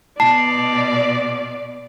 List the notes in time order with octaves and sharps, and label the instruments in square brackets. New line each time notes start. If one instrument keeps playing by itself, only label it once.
[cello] B2 B3 [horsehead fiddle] D5 [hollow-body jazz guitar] A5 [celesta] C7